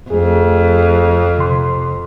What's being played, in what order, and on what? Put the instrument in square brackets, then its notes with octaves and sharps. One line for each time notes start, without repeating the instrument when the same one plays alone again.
[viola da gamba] F2 [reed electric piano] A3 G#4
[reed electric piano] C3 C6